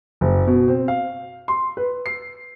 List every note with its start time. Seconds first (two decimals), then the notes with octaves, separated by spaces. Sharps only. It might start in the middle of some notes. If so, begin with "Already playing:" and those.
0.21 F#1
0.47 B2
0.68 C4
0.88 F5
1.48 C6
1.77 B4
2.06 C7